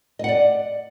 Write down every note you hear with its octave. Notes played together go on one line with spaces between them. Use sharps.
D5 D#5 F#5